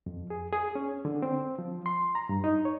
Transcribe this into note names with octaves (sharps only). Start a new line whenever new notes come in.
F2
G#4
G#4
C#4
D3
C4
F3
C6
A#5
G2
D#4
C#5